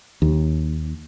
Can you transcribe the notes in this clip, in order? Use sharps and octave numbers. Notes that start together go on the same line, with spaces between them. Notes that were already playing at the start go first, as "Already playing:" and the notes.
D#2